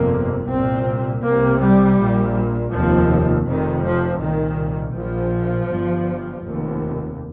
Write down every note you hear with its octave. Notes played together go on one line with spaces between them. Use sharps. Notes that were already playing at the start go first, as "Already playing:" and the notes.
Already playing: G1 F2 C3 A#3
C2 A#2 C4
C2 C3 A#3
G3
A#1 A#2
F1 D#2 F3
F1 F2 C3 D#3
F3
C2 A#2 D#3
A#1 A#2 F3
G1 G2
F1 D#2